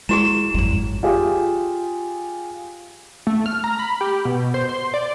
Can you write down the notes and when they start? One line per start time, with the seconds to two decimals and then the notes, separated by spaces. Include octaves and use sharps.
0.09 G#3 E4 F#4 G#4 E7
0.54 G#1 F2 F#3
1.03 F4 G4 G#4
3.27 A3
3.46 F6
3.64 A#5
3.79 B5
4.01 G4
4.25 B2
4.54 C5
4.69 C6
4.94 D5